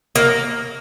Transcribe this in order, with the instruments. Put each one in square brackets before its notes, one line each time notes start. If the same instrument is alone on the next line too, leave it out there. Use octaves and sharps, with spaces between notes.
[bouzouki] A#3